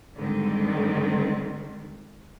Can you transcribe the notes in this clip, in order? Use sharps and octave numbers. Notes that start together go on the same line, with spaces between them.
G#2 D3 D#3 G3 C4